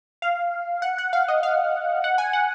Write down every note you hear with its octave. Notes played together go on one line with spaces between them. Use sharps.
F5
F#5
F#5
F5
D#5
F5
F#5
G#5
F#5